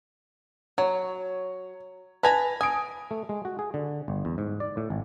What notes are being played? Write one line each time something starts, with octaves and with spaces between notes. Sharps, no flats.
F#3 C#5
B4 G#5 A5 B5 A#6 F7
G#5 D#6 D7
A3
G#3
F#4
G#4
D3
G1
E2
G#2
D5
A2
G#1